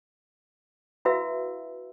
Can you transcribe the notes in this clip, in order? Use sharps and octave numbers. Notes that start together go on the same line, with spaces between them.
E4 F#4 B4 E5 F5 E6